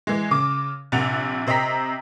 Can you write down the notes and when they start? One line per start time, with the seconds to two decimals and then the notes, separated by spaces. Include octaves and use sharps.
0.07 E3 G#3
0.31 C#3 D6
0.92 A#1 C3 F#5 A6 F7
1.47 C3 C5 D#5 G5 A#5 B6